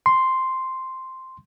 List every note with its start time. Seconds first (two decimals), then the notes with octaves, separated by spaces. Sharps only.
0.06 C6